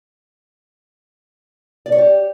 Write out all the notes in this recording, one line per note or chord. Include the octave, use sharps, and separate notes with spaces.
D5
C#5
G4